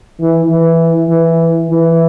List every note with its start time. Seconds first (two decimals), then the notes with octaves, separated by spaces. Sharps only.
0.20 E3
0.49 E3
1.09 E3
1.69 E3